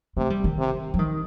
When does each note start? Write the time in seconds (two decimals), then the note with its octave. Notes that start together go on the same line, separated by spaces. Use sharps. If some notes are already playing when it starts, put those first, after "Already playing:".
0.16 C3 A3
0.30 G3
0.44 D#3
0.58 C3
0.94 F#3
0.99 D#3